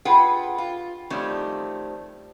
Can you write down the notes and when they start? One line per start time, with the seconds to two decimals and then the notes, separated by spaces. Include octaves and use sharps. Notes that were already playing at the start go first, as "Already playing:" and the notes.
0.05 F4 G#4 A4 B4 F#5 G5
0.58 F4
1.10 D#3 F3 G3 A3 C4 C#4